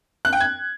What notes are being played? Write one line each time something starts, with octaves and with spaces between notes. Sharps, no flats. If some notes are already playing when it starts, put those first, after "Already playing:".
F#6
G5
G#6